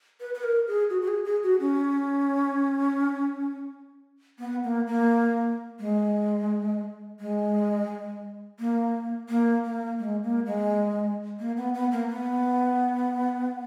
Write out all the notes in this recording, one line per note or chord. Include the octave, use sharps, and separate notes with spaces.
B4
B4
A#4
G#4
F#4
F#4
G#4
G#4
F#4
C#4
B3
A#3
A#3
G#3
G#3
A#3
A#3
A#3
G#3
A#3
G#3
A#3
B3
B3
A#3
B3